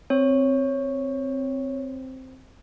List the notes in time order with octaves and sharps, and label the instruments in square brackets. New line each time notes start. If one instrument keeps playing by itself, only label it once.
[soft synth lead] C4 [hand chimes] C#5